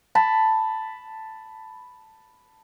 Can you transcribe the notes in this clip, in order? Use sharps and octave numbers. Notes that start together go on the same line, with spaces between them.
A5 B5